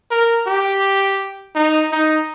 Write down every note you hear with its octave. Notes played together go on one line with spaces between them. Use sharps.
A#4
G4
D#4
D#4